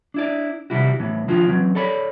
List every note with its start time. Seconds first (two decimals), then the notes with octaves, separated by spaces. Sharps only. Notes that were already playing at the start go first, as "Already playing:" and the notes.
0.14 D4 E4 D5
0.70 C3 D#3 G3 E4 F#4
1.00 A2 E3 B3
1.28 D#3 F3 D4 F4 F#4
1.48 E3 F#3 C4
1.75 A4 C#5 D5 B5